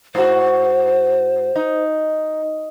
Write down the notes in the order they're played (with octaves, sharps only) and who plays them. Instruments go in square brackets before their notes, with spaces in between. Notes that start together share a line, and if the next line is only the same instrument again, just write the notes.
[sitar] G#2 F#4 [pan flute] C5
[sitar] D#4